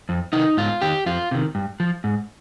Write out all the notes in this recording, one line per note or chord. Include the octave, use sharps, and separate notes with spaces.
F2
C3 D#3 D#4
G#2 F4
D#3 G4
F2 F4
C3 D#3
G2
F3
G#2